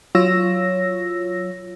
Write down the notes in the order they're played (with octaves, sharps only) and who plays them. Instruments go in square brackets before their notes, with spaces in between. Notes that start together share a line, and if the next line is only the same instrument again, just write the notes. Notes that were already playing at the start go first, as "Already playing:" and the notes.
[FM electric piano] F#3 F4 C#5 E6 A#6